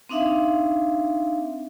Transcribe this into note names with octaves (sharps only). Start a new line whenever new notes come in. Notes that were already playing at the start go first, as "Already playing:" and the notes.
C4 D4 D#4 E5 F5